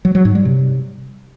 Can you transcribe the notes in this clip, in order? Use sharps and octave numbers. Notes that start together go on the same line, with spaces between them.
F#3
F#3
G#2
G3
C3